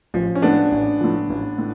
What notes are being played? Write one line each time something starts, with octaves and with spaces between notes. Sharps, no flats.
A1 F3
C#4
A2 F3 B3 D4
A1
A2 F3
A1
A2